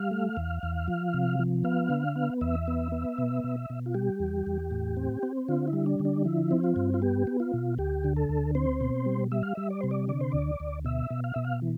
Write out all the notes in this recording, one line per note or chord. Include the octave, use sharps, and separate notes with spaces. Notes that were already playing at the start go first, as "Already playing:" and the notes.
Already playing: G3 F5
A3
E2
E2
F3
C3
F3
B3 F5
D3
B3
E2 E5
B3
B3
B2
B2
B2
F4
G3 G4
E2
E2
A2
C4
C4
D3 F4
E4
G3
D4
D3
D4
F3 E4
C4
F4
G2
F4
B3 G4
B3
F4
B2
D2 G4
D3
A4
D2
C4 C5
B2
G3
G3 E5
F5
G3 E5
D5
C3 C5
D5
D3 D5
C5
D2 D5
D2
B2 E5
B2
F5
B2 E5
F5
E3